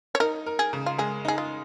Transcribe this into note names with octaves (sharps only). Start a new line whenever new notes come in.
C#5
D#4 A#4
A#4
G#4
C#3
F4
G#3 G#4
D#4 G#4
F4